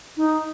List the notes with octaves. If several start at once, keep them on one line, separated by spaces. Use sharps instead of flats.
D#4